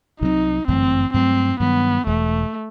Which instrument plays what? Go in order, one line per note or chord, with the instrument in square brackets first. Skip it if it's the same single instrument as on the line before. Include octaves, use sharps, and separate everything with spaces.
[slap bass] C2 C3 F#3 C4 [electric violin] D#4
[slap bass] G1 F#2 E3 A3 [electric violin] C4
[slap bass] G2 F#3 A3 [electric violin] C4
[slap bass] G2 D#3 F#3 [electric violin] B3
[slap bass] E1 E2 B2 [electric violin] A3